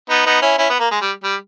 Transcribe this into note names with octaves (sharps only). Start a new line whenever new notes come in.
B3 D#4
B3 D#4
C#4 E4
C#4 E4
B3
A#3
G#3
G3
G3